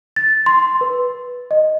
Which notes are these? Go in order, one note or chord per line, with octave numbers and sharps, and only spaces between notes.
A6
C6
B4
D#5